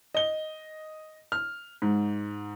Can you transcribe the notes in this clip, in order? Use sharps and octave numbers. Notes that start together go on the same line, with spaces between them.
D#5 G7
F6
G#2